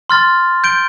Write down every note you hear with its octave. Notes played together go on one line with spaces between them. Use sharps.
C6 F6 A6
G6 D7 G7